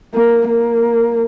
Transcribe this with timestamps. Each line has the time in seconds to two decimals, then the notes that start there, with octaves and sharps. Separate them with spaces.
0.14 A#3
0.48 A#3